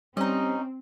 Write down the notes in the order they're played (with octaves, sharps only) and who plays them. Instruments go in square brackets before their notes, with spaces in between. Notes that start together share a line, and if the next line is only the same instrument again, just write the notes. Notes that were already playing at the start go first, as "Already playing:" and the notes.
[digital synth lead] G3 [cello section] C4 [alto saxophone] C#4 [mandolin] D#4 D#5